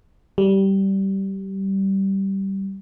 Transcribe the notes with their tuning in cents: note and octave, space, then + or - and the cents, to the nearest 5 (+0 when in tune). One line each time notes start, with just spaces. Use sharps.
G3 -15